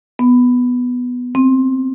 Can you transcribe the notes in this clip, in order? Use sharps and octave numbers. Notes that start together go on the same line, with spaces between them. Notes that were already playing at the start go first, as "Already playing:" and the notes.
B3
C4